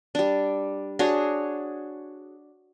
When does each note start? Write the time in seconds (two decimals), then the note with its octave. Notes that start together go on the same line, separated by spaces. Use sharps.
0.15 G3 D4
0.99 D4 F#4 G#4 C#5